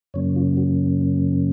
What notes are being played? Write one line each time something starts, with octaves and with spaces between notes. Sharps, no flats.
F#2 C#3 F#3 A#3 C#4 C#5
F4
F#4